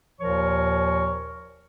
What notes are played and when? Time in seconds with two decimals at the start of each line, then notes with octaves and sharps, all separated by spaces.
0.20 D#2 A#2 F3 A#4 C#5 C#6